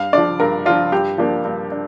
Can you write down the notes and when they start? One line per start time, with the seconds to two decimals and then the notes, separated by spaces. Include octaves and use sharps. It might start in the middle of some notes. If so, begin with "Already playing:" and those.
Already playing: G2 F5
0.13 F3 D4 D5
0.40 G2 A#4
0.66 F3 D4 F4
0.92 G2 G4
1.18 F3 A#3 D4
1.45 G2
1.72 D4